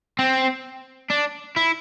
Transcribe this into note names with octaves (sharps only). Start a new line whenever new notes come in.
C4
D4
E4